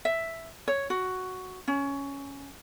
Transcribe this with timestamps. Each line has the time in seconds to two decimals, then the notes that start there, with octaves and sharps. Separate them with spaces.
0.05 E5
0.68 C#5
0.90 F#4
1.68 C#4